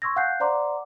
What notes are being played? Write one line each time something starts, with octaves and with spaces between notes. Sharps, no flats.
C6 C#6 E6 G#6 A#6
F5 F#5 G#5 F#6 G6 C7
C5 D5 F#5 A#5 C6 D6